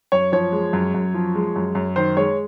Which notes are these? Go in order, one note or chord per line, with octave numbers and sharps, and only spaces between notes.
F#2 C#5
F3 C#5
G#3
F#2
F#2
F3
G#3
F#2
F#2
D#3 C5
G#3 C#5